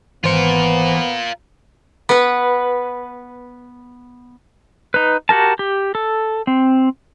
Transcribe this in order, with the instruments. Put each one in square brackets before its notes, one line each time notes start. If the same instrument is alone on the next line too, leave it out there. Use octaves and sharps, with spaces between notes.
[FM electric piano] G#1 C5 C#7 [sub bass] E3 [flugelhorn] B3 [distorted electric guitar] F4 A#4
[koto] B3 B4
[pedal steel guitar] D#4 B4
F#4 G4 A#4 A5
G4
A4
C4